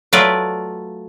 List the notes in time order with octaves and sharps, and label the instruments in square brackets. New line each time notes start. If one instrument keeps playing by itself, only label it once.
[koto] F#3 A3 F4 B4 D5